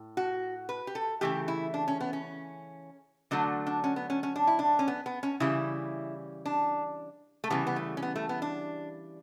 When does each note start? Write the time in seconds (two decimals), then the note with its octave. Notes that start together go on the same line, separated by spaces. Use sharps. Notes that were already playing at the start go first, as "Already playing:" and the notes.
Already playing: A2
0.17 F#4
0.69 B4
0.87 G4
0.95 A4
1.21 C#3 E3 A3 G4
1.48 E4
1.74 D4
1.88 C#4
2.01 B3
2.13 C#4
3.31 D3 F#3 A3 D4
3.67 D4
3.84 C#4
3.96 B3
4.10 C#4
4.23 C#4
4.36 D4
4.47 E4
4.59 D4
4.79 C#4
4.88 B3
5.06 B3
5.23 C#4
5.40 C#3 E3 G3 E4
6.46 D4
7.44 A3
7.50 C#3 E3 G3 B3
7.67 B3
7.76 A3
7.97 C#4
8.02 B3
8.16 A3
8.29 B3
8.42 D4